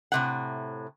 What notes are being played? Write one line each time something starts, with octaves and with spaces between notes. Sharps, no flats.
A2 C3 F#5